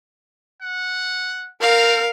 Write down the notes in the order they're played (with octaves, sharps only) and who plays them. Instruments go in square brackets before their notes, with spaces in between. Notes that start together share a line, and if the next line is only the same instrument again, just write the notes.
[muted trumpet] F#5
[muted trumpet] C4 [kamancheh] A#4 [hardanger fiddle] F5